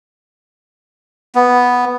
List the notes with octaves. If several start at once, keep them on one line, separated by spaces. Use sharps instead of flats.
B3